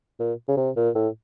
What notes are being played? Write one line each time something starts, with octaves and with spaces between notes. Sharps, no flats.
A#2
C#3
C3
A#2
A2